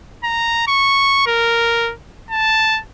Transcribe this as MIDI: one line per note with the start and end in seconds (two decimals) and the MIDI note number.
0.24 0.66 82
0.68 1.22 85
1.27 1.92 70
2.31 2.81 81